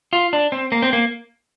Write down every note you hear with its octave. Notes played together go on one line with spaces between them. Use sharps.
F4
D4
C4
A#3
C4
A#3